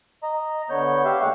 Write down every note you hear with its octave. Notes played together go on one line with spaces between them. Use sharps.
D#5 A#5
D3 B3 C#5 G6
G4 E5 F5
D#2 G#3 F#5 C#6